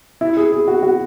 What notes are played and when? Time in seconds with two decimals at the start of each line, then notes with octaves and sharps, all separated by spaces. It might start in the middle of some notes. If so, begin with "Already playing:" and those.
0.21 E4
0.37 G#4
0.52 G#4
0.68 F#4
0.83 F#4